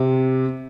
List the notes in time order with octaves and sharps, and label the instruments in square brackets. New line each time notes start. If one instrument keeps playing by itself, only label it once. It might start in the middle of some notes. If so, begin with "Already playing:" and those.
Already playing: [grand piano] C3